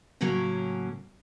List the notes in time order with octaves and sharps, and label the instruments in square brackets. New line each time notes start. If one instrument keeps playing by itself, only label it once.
[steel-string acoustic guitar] A2 C#3 F#3 A#3 C#4 A#4